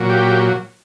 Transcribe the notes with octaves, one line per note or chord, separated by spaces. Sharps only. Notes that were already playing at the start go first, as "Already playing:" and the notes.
Already playing: A#2 F#3
G4